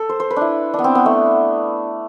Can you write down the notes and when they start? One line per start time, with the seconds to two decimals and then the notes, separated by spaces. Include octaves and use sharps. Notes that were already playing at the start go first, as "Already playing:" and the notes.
Already playing: A4
0.09 C5
0.20 C5
0.31 B4
0.36 D4 E4
0.74 D4
0.79 B3
0.84 C4
0.95 B3
1.06 A3